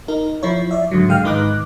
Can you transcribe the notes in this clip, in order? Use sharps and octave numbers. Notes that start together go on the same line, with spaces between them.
D#4 A#4
F3 E4 C#5
D5 E5
G#2 D3 F#3
D3 G#3 F5 G5 F6
G#2 D#3 D#4 B4 D6 F#6